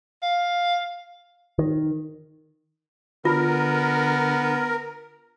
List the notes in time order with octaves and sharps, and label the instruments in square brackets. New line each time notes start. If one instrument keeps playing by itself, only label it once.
[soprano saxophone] F5
[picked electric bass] D#3
[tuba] D3 [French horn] B3 [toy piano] F4 [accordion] A#4